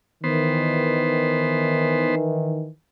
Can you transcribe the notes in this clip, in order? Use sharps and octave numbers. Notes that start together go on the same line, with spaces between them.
D#3 E3 B3 C5